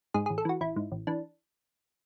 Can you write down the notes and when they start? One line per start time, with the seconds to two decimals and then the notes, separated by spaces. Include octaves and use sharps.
0.14 G#2 G#4
0.26 G#4
0.30 A1
0.38 A4
0.45 E3 F#4
0.61 A1 E4
0.76 G#2
0.92 A1
1.07 E3 D4